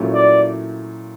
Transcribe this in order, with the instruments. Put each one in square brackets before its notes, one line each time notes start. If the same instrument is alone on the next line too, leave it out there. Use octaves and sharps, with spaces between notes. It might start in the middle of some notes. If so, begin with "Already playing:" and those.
Already playing: [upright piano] A#2 F#3 A3 C#4 E4
[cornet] D5